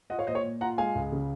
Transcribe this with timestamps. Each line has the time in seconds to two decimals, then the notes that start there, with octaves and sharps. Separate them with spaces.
0.10 F4 D#5 F#5
0.19 C#5 F5
0.27 A#2 C5 D#5
0.35 C#5
0.44 A#2
0.61 F4 F#5 A#5
0.78 G#3 F5 G#5
0.95 C#2
1.12 C#3